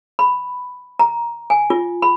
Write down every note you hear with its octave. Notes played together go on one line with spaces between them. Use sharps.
B5
A#5
G#5
F4
B5